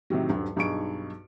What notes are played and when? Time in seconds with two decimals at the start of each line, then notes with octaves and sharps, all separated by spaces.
0.10 A2 C3 D#3 F#3
0.29 D#1 G2 F#3
0.56 B1 G2 D#4 G#4 C#6 D7